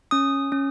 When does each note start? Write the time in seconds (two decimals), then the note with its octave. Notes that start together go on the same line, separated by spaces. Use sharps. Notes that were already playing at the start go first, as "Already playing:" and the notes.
0.11 C#4 D#6
0.52 C#4